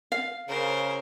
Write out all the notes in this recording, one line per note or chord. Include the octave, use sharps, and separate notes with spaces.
F5
C#3 A#4 C5